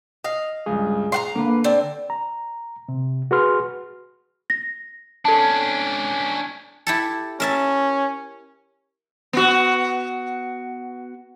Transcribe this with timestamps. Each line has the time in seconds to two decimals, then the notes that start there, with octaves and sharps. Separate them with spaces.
0.24 D#5 F5
0.66 C#2 G2 G#4
1.12 F5 F#5 A#5 C6
1.35 D3 A#3 B4
1.64 C4 D5 A5
2.10 A#5
2.89 C3
3.31 F#4 G#4 B4 C6 F6
4.50 A#6
5.25 C#4 D4 A4 A5
6.87 E4 G4 A4
7.40 C#4 A#4 E5 A5
9.33 B3 F#4